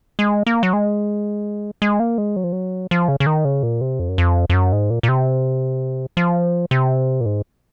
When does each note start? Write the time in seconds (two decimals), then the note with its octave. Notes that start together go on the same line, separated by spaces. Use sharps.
0.19 G#3
0.47 A#3
0.63 F#3
0.73 G#3
1.82 G#3
2.00 A#3
2.18 G#3
2.36 F#3
2.44 F3
2.52 F#3
2.91 F3
3.08 C#3
3.20 C#3
3.26 D#3
3.45 C#3
3.63 A#2
3.81 C3
3.99 F2
4.09 F#2
4.18 F2
4.50 F2
4.53 F#2
4.73 G#2
4.90 A#2
5.03 A#2
5.09 C3
6.17 F3
6.71 C3
7.21 A#2
7.26 G#2